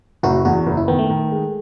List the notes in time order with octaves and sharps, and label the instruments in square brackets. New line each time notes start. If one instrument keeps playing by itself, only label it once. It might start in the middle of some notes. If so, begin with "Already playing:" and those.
[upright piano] F#1 [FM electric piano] F#4
[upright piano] E2 [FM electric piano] F#4
[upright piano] F#1
[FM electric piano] E4
[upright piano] D#3 [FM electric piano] B3
[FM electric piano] A3
[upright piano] D#3
G#3